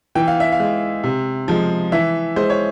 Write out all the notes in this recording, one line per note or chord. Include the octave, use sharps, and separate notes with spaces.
E3 G5
F5
E5
F5
G#3
C3
F3 G#3
E3 E5
G#3 C5
C#5